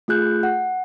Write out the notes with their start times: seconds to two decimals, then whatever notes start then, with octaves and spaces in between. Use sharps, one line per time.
0.08 A3 F4 G#4 F#6 G6
0.43 F#5